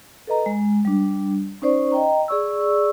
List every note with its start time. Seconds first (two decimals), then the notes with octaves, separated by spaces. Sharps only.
0.27 A4 B4 D#5 A#5
0.46 G#3
0.85 G3 D4
1.62 C#4 D#4 C5 D5 C#6
1.92 D#5 G5 A#5
2.28 G#4 D5 C#6 E6